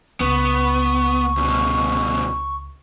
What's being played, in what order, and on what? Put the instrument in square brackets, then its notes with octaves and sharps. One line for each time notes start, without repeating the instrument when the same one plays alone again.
[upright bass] C#2 [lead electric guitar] B3 [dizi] C#6
[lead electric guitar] D2 B2